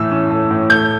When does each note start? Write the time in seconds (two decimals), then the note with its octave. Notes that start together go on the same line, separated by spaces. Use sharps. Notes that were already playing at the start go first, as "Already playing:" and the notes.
Already playing: A2 E3 A3 E6
0.11 C#4
0.30 A3
0.51 A2
0.70 A3 G6